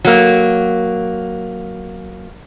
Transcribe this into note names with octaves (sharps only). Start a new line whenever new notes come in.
F#3 A#3